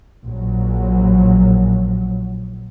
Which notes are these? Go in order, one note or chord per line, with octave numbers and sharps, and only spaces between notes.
A#1 F#3